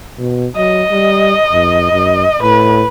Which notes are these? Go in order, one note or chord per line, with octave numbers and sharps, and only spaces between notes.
B2
F#3 D#5
G3
F2
F#2
A2 B4